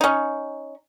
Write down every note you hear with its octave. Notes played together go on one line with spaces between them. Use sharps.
C#4 D#4